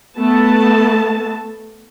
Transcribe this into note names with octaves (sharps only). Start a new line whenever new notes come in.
A3 B3 A5